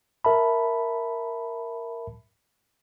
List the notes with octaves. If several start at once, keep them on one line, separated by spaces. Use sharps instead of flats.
A#4 E5 A5 B5